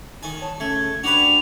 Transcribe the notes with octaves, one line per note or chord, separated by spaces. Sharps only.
D#3 G#5
C#5 A5
C#3 A3 G#6
D4 F#4 G4 B4 F7